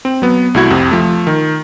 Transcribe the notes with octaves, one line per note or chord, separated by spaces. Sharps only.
C4
F#3 B3
C2 A3 E4 F#4 G#6
F2 C3
F3 A3
D#3